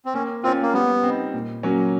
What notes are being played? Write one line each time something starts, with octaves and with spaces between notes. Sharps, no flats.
C4
A#3 C#4
C4 C#4 F4
A#3
G3 B3
C4 D#4
A#2
F#3 A#3 C#4